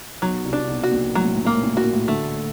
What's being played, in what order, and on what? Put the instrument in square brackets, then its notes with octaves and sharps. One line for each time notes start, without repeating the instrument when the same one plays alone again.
[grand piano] B1 B2 [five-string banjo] F#3
[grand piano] C2 C3
[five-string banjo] D4
[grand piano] B1 B2
[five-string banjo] F#4
[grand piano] A#1 A#2
[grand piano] A2 [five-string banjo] F#3
[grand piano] A#2
A2
[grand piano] A#2 [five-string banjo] A#3
[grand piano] A2
A#2
[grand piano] A2 [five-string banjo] F#4
[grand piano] A#2
A2
[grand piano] D2 D3 [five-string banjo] A3